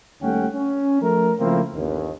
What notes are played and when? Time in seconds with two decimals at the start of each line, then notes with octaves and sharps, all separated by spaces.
0.21 D#2 G3 A3 C#4 F#5 G5
0.53 C#4
1.01 F3 A3 A#4
1.39 C#3 F3 A3 A#3 C4 E4
1.74 G1 D#2